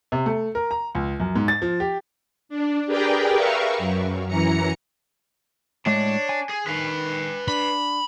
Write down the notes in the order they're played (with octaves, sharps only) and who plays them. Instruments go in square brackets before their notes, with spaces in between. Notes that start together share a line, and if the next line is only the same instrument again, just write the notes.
[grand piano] C3
A3
A#4
A#5
C#2
F#2
G#2
A6
F3
G4
[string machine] D4
G4 G#4 A#4 B4 D5 G5
A#4 B4 E5 F5 C#6
F#2
F#2 E3 A#5 C#7
[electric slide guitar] A2 G#3 A3 [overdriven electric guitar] D4 [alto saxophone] C#5
[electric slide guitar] G#5
[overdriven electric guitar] G#4
[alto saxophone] D#3 [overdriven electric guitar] B4 F5
[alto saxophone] D4 [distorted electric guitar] B5